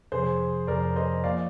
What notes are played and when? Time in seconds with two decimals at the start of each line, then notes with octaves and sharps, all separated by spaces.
0.12 F2 C3 F3 G#4 C5
0.67 F2 C3 F3 A#4 D5
0.96 C5 D#5
1.24 F3 A#3 F4 D5 F5